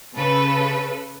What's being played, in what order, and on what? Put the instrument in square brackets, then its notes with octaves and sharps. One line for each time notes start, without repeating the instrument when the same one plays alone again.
[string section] C#3 A4 B4